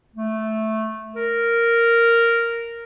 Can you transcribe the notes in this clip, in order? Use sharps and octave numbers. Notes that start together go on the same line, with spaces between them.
A3
A#4